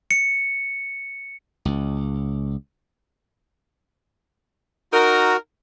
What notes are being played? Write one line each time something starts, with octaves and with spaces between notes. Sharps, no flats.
C#7
C#2
D#4 F#4 A#4